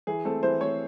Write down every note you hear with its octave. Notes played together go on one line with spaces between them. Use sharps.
E3 G#4
A3 C4 A4
E3 C5
A3 C4 C#5